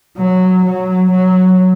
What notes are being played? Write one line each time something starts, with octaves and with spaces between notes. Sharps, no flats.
F#3
F#3
F#3